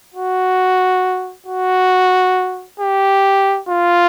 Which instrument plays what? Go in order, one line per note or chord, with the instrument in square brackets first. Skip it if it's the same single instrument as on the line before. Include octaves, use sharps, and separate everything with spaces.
[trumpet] F#4
F#4
G4
F4